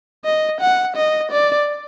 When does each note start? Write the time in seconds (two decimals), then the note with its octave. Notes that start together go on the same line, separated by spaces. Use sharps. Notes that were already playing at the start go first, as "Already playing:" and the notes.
0.25 D#5
0.61 F#5
0.96 D#5
1.31 D5